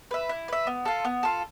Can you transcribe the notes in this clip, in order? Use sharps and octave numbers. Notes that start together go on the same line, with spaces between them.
B4 E5
E4
B4 E5
B3
F4 A4
B3
F4 A4